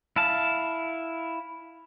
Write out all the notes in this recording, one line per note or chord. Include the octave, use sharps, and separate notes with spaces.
E4 F5 A5